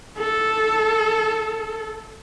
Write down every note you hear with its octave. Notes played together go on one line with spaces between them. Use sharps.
A4